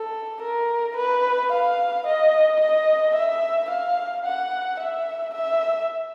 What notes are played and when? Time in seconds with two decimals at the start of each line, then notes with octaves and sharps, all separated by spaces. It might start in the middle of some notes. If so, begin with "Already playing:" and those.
Already playing: A4
0.42 A#4
0.97 B4
1.52 F5
2.06 D#5
2.61 D#5
3.15 E5
3.70 F5
4.26 F#5
4.80 E5
5.35 E5